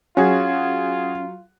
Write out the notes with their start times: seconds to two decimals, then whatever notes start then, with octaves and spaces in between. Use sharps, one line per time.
0.17 F#3 C#4 F4 F#4 G#4